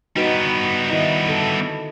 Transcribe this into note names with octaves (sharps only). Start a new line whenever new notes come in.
G3 B3 D#4 F#4 B4
D#3 E4 D#5
D3 A4